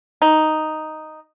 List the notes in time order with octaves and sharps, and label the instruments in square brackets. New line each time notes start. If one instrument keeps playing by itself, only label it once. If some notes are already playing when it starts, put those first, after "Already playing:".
[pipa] D#4